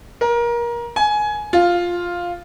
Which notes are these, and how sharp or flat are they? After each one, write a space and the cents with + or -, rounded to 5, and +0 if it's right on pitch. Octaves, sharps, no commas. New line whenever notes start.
A#4 +25
G#5 +15
F4 +5